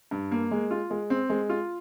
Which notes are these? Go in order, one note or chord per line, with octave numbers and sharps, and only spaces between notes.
G2
A#3
G#3
F4
G#3
C4
G#3
F4